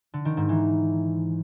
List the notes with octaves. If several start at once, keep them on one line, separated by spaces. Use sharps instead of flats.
D3
D#3
G#2
E3